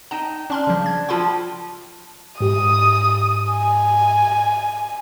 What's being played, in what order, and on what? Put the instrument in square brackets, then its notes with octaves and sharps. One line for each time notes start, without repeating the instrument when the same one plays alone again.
[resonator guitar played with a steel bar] D#4 G5 [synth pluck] A5
[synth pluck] C#4 C6 F6 [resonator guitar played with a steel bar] D4
[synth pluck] C#3 F3
G#6
[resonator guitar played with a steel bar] F3 A4 G5 [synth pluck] F4 B5 C6
[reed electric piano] G#2 G4 [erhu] D#6
[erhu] G#5